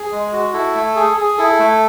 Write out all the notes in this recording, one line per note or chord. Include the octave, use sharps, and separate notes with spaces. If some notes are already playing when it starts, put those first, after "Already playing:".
Already playing: G#4
G#3
F#4
E4 A4
A3
G#4
G#4
E4 A4
A3